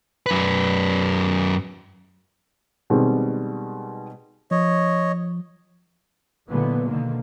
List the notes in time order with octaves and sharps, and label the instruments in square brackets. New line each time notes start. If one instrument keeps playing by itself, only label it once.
[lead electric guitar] F#2 B4
[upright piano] B2 D#3 G3 G#3 C4
[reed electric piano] F3 [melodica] C#5 D#5
[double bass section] A#2 D3 E3 F#3 G#3 B3
B2 D3 D#3 A#3